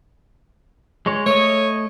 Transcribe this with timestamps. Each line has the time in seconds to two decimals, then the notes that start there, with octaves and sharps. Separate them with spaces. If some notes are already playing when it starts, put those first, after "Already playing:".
1.06 G#3 C#5
1.26 A3 C#5 D#5